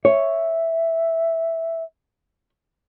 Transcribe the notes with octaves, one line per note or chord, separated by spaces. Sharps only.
C#5 E5